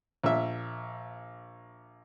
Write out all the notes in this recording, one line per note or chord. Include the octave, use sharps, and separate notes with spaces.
A#1 E5